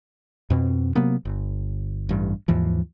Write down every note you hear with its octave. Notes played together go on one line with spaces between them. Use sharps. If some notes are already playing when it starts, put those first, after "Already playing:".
F2 B2 C4
C3 F#3 A#3 B3
G1
A1 G2
D#2 G#2 E3 F3